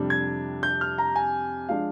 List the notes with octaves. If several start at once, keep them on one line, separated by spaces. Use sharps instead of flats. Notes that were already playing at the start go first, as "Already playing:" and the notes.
Already playing: F2 C3 G3 D4
G#6
G6
F6
A#5
G#5
F3 G#3 D4 F5